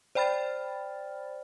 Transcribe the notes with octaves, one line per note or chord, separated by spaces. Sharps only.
C5 D5 G5 B5 F6 A6